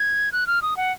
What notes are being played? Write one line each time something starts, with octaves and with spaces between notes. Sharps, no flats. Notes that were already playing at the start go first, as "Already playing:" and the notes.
Already playing: G#6
F#6
F6
D#6
F#5